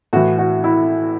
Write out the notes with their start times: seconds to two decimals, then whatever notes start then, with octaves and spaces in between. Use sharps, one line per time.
0.13 A2 E3 F#4
0.39 F#4
0.64 E4